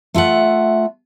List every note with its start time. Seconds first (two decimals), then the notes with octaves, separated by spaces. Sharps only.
0.14 A3 F4 E5 F#5